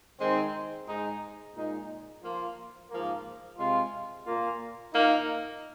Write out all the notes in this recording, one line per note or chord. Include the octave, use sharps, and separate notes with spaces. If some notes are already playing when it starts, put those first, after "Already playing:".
D#3 G#3 C4 D#4
G#2 G#3 D#4
A#2 G#3 D#4
F3 A#3 F4
G#2 F3 A#3
C3 G#3 F4
A#2 A#3 F4
A#2 A#3 D#4